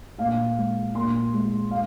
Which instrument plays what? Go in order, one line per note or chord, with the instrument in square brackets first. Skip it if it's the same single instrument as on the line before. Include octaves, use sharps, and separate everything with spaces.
[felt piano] A#2 F5
G#3
A#2 C6
G#3
F5